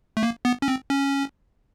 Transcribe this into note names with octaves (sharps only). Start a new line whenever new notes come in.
A3
A#3
B3
C#4
C4
C#4